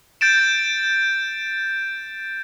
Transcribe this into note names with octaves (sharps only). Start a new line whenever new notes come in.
G6 A6 D7 E7